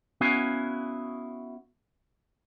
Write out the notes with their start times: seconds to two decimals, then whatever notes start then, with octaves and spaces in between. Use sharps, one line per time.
0.21 B3 C#4 E4 F#4 F5 G#5